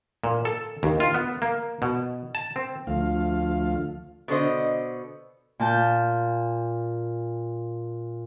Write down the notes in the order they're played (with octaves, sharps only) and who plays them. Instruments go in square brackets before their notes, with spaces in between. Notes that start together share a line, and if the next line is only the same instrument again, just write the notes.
[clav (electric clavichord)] A#2
A4
D#2
F4
B3
A#3
B2
A5
C4
[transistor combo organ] D2 F3 A3 F5
[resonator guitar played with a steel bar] B2 D3 C5 D#5
[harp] A#2 A5 G6